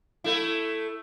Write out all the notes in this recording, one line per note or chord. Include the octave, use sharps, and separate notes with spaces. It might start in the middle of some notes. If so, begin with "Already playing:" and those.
A3 E4